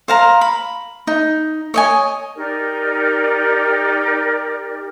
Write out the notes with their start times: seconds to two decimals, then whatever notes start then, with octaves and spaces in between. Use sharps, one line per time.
0.08 C5 F5 A#5
0.41 B5
1.07 D#4
1.74 C#5 D#5 G#5
2.36 D#4 G4 A#4 D5